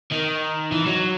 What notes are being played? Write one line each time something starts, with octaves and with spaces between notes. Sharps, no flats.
D#3
E3
F#3